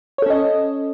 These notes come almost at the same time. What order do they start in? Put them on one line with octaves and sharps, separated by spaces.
C#5 A4 C#4 D#5